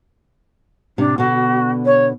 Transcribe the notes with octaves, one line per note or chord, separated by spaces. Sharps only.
A2 C3 D4
B2 D3 F#4
C#5